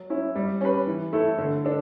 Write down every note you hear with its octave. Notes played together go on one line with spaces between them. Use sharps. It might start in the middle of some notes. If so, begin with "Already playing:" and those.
Already playing: F#3
C#4 E4
G3
C#4 G4 B4
E3
A3 E4 A4
D3
D4 A4